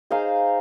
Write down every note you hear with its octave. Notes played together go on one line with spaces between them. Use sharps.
D#4 G#4 C5 F5